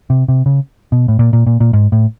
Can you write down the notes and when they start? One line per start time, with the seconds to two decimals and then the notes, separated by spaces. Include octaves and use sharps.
0.10 C3
0.28 C3
0.46 C#3
0.92 B2
1.08 A2
1.19 A#2
1.33 A#2
1.47 A#2
1.60 A#2
1.73 G#2
1.92 A2